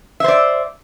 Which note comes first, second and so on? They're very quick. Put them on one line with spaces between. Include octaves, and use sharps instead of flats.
E5 C5 D5